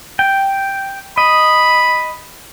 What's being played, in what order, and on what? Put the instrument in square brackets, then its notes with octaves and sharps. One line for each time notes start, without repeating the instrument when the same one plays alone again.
[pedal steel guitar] G5
[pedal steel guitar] D#5 [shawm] B5